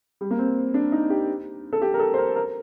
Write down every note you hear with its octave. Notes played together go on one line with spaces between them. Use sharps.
G3
A#3
C4
D4
D#4
G4
A4
G4
A#4
A4
C5
A#4
A#4